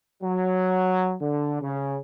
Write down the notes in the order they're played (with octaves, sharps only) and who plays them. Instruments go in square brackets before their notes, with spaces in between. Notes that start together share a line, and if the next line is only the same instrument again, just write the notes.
[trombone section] F#3
D3
C#3